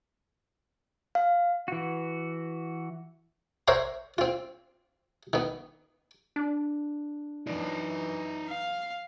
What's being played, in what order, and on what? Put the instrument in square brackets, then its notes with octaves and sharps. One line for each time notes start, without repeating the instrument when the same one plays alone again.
[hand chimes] F5
[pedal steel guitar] E3 F#4
[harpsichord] A#4 C5 C#5 E5 F#5 C6
C4 F4
D#3 B3
[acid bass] D4
[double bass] F#2 E3 [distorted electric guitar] D#4 D5
[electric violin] F5